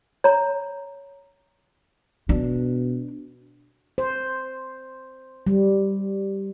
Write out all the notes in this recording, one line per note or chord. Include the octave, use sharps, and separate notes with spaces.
C#5 A#5
B2 D4
C5
G3